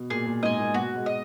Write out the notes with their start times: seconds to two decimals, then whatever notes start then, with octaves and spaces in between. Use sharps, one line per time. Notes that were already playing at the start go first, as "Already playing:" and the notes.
Already playing: B2
0.10 A#2 G#4
0.26 A#2
0.42 G#2 D#5 G#5
0.58 A#2
0.74 B2 F#4
0.96 G#3
1.06 D#5